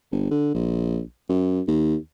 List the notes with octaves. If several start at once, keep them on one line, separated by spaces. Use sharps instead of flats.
G1
D3
A#1
F#2
D#2